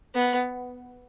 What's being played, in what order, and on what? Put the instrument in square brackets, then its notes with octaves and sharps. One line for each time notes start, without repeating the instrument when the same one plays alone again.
[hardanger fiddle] B3